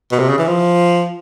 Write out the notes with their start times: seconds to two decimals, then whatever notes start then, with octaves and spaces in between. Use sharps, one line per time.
0.11 B2
0.19 C3
0.29 C#3
0.38 E3
0.47 F3